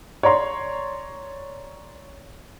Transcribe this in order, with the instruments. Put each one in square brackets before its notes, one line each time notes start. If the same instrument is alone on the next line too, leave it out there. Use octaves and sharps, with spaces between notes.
[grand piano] C#5 D5 A#5 C6